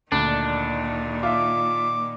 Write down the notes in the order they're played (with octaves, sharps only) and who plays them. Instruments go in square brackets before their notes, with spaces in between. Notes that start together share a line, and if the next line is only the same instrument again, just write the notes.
[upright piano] D2 [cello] A#2 D#3 [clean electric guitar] D4
[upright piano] F4 E5 [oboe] D6